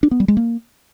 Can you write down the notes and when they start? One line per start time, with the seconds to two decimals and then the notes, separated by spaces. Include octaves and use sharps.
0.03 D4
0.11 B3
0.20 G3
0.28 G#3
0.37 A#3